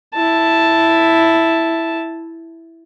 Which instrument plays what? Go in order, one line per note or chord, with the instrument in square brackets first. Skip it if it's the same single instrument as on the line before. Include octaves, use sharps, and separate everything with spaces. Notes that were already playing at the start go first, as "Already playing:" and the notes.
[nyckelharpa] E4 A5